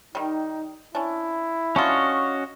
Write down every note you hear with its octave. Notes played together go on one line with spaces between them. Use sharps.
D#3 G3 D#4
C#4 D4 E4
C#4 D4 F4 F#4 D#5